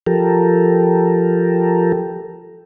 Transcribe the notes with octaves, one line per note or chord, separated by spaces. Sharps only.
F3 G4 A4 A#4